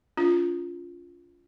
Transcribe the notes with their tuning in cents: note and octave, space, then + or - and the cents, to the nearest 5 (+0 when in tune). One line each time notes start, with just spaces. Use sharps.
C#4 +40 F4 +0